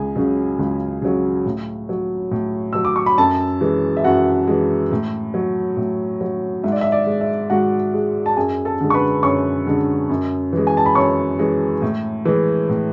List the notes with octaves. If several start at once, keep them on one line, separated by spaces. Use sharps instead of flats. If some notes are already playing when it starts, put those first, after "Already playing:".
Already playing: C#2 G#4 G#5
C#3 F#3
C#2
C#3 F#3
A2
F#3
A2
F#3 E6
D6
C#6
B5
F#2 A4 A5
E3 G#3
E5
F#2 F#4 F#5
E3 G#3
A2
F#3
A2
F#3
G#2 E5
D5
E5
D5
G#3
E5
G#2 F#4 F#5
G#3
A5
F#2 G#4 G#5
A4 A5
D3 G#3
C#6
B4 B5
F#2 C#5 C#6
D3 G#3
F#2
E3 G#3
G#5
A5
B5
F#2 C#5 C#6
E3 G#3
A2
E3 G#3
A2